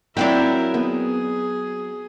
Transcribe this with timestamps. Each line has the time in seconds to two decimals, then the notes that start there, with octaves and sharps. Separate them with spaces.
0.17 F#3 C4 D4 E4 A#4 C#5 F5 G5
0.74 B3 G#4